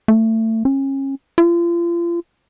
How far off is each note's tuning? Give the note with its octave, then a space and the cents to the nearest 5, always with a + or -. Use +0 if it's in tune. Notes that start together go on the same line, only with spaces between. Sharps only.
A3 +25
C#4 -30
F4 -35